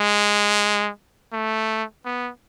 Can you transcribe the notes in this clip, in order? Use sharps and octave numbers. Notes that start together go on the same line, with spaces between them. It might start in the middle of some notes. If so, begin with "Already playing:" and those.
Already playing: G#3
A3
B3